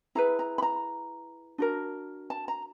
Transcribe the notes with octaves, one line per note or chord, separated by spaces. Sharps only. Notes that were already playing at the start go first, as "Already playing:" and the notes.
E4 G#4 B4 A#5
A#5
B5
A#5
D4 F#4 A#4
A5
A#5